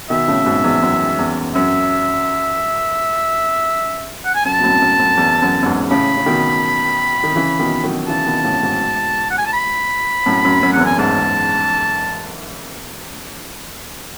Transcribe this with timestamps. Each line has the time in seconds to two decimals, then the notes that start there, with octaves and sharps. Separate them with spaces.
0.10 B2 D#3 E5
0.28 A2 C#3
0.45 G#2 B2
0.64 E2 G#2
0.82 F#2
1.19 E2
1.55 F#2 E5
4.25 F#5
4.35 G#5
4.45 F#2 A5
4.59 B2
4.63 F#2 A2
4.82 F#2
4.99 F#2
5.17 E2
5.42 F#2
5.62 F#2
5.66 E2 G#2
5.90 A2 C#3 B5
6.17 C#3
6.26 B2 D#3
7.24 D#3
7.36 C#3 E3
7.59 B2 D#3
7.83 D#3 F#3
8.08 C#3 E3 A5
8.26 B2 D#3
8.44 A2 C#3
8.63 G#2 B2
9.31 F#5
9.38 G#5
9.46 A5
9.53 B5
10.26 F#2 A2
10.45 F#2
10.63 F#2
10.73 E2 F#5
10.81 F#2 G#5
10.99 E2 G#2 A5